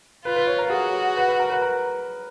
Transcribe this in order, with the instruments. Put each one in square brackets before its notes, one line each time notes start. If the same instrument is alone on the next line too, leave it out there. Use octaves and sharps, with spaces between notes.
[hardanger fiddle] F4 [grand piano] B4
[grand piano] B4
C#5
A#4
[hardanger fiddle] F#4 [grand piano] G#4
[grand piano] G#4
B4
B4
A#4
B4
A#4